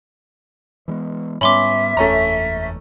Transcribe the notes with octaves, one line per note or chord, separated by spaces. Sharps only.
E3 G#3 B3
G#2 G3 B3 C#4 E5 B5 C6 D6
F#1 E2 A3 C#4 A#5